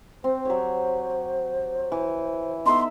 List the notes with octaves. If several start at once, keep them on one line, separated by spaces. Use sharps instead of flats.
C4 C5
F#3 G4 C#5
E3
B3 D#4 A4 E5 C6